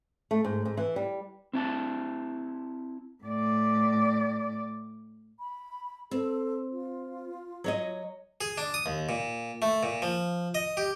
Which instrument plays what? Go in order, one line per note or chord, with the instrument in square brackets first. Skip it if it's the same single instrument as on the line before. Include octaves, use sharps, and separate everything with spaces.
[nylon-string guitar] A3
G#2
G#2
E3
G3
[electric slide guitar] C4 E4 A5
[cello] A2 D5
[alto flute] B5
[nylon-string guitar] C4 [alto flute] A4
[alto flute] F4
[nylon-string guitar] F#3 C#5 D#5
[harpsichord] G#4
D4
D#6
D#2
A#2
A3
A#2
F3
D#5
G4